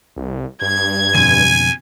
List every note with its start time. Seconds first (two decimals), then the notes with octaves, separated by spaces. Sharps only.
0.16 C2
0.62 G2 G#6
1.14 F2 B2 D3 G#5